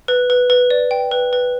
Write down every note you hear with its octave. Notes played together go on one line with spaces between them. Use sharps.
B4
B4
B4
D5
G5
B4
B4